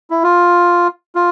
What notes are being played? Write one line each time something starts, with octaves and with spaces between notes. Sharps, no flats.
E4
F4
F4